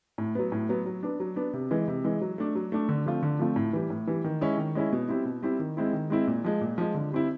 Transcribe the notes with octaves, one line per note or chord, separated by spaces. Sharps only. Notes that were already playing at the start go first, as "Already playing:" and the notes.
A2
F#3 B3
A2
F#3 B3
F#3
B3 D4
F#3
B3 D4
C3
E3 G#3
C3
E3 G#3
F#3
A3 D4
F#3
A3 D4
D3
F3 A3 C4 F4
D3
F3 A3 C4 F4
A2
E3 G3
A2
E3 G3
D#3
G#3 C#4 E4
D#3
G#3 C#4 E4
B2
G3 C4 E4
B2
G3 C4 E4
D#3
G#3 C4 E4
D#3
G#3 C4 E4
A#2
F3 G#3
A#2
F3 G#3
D3
G3 C4 E4